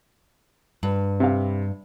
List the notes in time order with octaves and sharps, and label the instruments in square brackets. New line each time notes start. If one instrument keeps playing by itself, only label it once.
[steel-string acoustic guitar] G2
[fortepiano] C3 F5